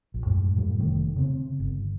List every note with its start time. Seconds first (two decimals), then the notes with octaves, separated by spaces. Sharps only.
0.14 A#1
0.26 F#2 A2 G#3
0.55 F#2 A2 D3 G3
0.78 F1 D#3 A3
1.16 C#3 C4
1.60 G1